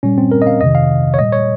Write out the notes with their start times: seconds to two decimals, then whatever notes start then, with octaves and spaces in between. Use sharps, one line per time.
0.03 A#2 G3 C#4
0.18 C4
0.31 A#4
0.42 D#5
0.47 F5
0.61 F2 C3 D#3 D#5
0.75 F5
1.14 C#5
1.19 A#2 G3 D#5
1.32 C#5